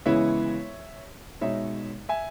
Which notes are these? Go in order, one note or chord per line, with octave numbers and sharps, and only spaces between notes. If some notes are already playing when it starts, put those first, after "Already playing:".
C#3 E3 G#3 B3 E4 C#5 E5
B2 G#3 D#4 C#5 E5
E5 G#5